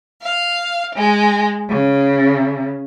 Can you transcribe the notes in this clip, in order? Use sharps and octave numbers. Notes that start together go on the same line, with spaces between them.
F5
G#3
C#3